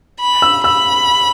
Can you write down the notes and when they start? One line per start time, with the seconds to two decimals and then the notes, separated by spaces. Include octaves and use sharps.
0.20 B5
0.42 E6
0.64 B5 E6